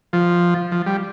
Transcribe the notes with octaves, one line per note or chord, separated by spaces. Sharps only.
F3
F3
G3